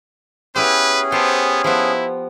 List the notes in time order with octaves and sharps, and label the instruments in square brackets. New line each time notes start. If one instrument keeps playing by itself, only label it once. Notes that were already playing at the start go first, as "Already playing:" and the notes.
[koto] B3 E4 G4 [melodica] C#4 G#4 [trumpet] B4
[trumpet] B3 [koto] G4 A4 C5
[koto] F3 B3 [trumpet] E4